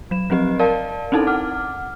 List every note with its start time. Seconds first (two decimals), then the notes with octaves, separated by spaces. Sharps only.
0.11 F#3 E7
0.30 F3 F#3 C4 G4 D#5
0.59 A#4 D5 F5 A5
1.12 C4 C#4 D#4 E4 A4
1.27 F#5 D6 F6